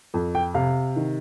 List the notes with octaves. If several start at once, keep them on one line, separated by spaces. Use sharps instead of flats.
F2
G5
C3 F5
D#3